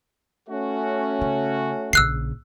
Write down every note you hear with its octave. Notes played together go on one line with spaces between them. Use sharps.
A3 C#4 F#4
C#3
A#1 C#3 E6 F#6 C7